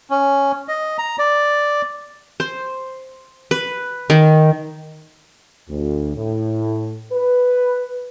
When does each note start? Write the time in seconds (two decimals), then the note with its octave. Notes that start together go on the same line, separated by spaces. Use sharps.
0.10 C#4
0.68 D#5
0.98 A#5
1.19 D5
2.40 C5
3.51 B4
4.10 D#3
5.70 D2
6.16 A2
7.13 B4